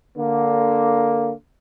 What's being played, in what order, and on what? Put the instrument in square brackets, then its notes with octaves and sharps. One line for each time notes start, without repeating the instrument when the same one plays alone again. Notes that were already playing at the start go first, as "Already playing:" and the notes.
[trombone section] D3 A#3